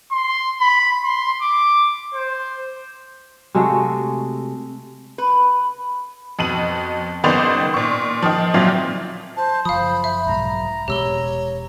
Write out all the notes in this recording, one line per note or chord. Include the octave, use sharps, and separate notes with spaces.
C6
B5
C6
D6
C5
C3 G#3 A3 F#4
B4
F2 B2 D#7 F#7
F#1 D#3 B3 C5 D5 F7
A#2 C#6
D#3 F3
F#1 A#2 F#3 C4 F4 E5
C5 A5
F#1 F3 F5 B5 D#6
E5
B1 G#2 A#5
E1 B2 G#3 G4 C#5 E6 G7